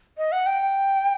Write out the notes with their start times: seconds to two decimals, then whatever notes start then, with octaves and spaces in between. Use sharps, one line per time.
0.18 D#5
0.32 F#5
0.46 G5